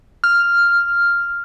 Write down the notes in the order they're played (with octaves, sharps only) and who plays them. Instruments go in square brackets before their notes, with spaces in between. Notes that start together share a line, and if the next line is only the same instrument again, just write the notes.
[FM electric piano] F6